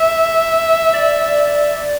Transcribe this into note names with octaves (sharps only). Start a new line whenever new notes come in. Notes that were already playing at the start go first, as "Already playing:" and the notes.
Already playing: E5
D5